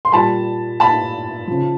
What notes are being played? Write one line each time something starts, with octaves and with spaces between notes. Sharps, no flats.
C6
A#2 G3 A5 B5
A5 B5
C#3 F3